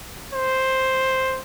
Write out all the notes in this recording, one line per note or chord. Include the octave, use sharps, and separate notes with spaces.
C5